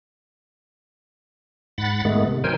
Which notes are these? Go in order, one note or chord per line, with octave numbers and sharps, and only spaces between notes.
G#2 F#5 B5 A6
G#2 D#3 G#3 A3 B3
C3
D#3 F#3 A#4 C5 G5 G#5